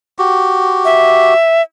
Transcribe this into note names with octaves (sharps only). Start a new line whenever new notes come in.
F#4 G4
E5